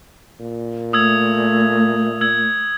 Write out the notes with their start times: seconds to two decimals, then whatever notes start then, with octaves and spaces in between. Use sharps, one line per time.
0.40 A#2
0.93 A3 D#6 E6 G#6
2.21 E6 G#6